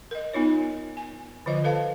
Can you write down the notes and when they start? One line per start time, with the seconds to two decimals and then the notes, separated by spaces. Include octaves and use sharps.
0.11 A#4 D#5
0.33 B3 D#4 F4 C#5
0.97 G#5
1.46 D3 F3 F4 C5 D#5
1.64 A4 B4 F5 A5